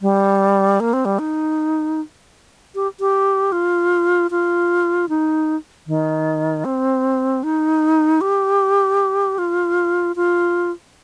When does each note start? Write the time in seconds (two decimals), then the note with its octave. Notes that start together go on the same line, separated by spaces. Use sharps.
0.02 G3
0.80 A#3
0.93 C4
1.05 G3
1.19 D#4
2.75 G4
3.00 G4
3.52 F4
4.31 F4
5.09 D#4
5.87 D#3
6.65 C4
7.43 D#4
8.21 G4
9.38 F4
10.16 F4